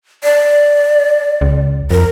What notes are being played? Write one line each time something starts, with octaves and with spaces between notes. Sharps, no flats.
D5
C#2
F2 A#4